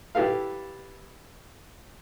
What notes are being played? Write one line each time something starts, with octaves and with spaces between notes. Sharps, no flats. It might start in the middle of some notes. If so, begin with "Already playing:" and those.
E4 G4 A4 B4 F5